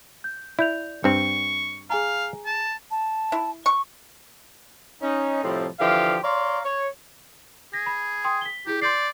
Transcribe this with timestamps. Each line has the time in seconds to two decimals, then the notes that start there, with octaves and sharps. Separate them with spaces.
0.24 G6
0.59 E4 D5 G6 F7
1.04 G2 C4 C#6
1.90 G#4 F5 G#5 A#5
2.46 A5
2.91 A5
3.32 E4
3.66 C#6
5.02 C#4 D#4
5.44 A2 C3 F3 G3 C4 D#4
5.79 D3 E3 F3 G4 F5
6.24 C#5 D5 F5 A#5 C6
6.65 C#5
7.73 G#4 A#6
7.86 B5
8.24 G5 C6 D#6
8.41 B6 G7
8.67 E4 G4 G#4
8.82 D5 C6 G6 C7